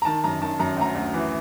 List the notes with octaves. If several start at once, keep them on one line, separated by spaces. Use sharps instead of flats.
A#5
D#3 A5
F#2 A#5
D#3 A5
F#2 A#5
D2 A#5
D2
E3